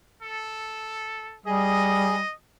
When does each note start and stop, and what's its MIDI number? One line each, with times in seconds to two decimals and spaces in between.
0.23 1.36 69
1.46 2.22 55
1.46 2.15 68
1.46 2.33 75